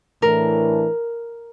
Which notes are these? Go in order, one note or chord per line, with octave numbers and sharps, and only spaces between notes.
A2 E3 A3 D4 A#4